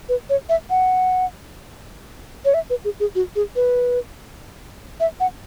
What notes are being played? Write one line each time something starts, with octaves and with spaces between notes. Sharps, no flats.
B4
C#5
E5
F#5
C#5
E5
B4
G#4
G#4
F#4
G#4
B4
E5
F#5